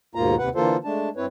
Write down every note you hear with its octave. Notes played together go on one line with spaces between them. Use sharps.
D#2 G#2 B2 A#3 F4 A#5
D#2 C3 B4 F#5
D3 E3 A#3 F4 A4 C5
G#3 A3 D4 A5
G2 C4 E4 B4 C#5